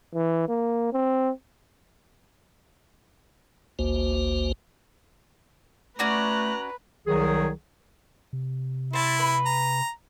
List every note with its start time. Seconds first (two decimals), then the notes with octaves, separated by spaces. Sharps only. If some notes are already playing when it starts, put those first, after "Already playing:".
0.14 E3
0.49 A#3
0.93 C4
3.79 G#1 D2 A#3 F#4 C5
5.99 A3 C#4 F#4 B4 D5 A#5 F#6
7.07 C2 D#3 F#3 G#4
8.33 C3
8.93 E4 C5 A5
9.19 B4 B5
9.46 A#5